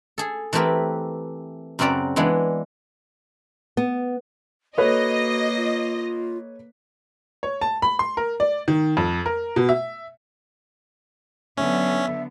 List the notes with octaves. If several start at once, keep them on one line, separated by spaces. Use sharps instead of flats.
G#4 A4
E3 A3 C4 G4 A#4 B4
F#2 C#3 C4 F#4 D5 A#5
E3 G#3 B3 D4
B3
A#3 F#4 A4 B4 C#5 D#5
F4
C#5
A5
B5
C6
A#4
D5
D#3
F2
A#4
B2
E5
D3 F#3 B3 C#4 E5